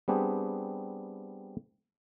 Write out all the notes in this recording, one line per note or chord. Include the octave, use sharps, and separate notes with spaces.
G3 B3 C4 D4 G4 G#4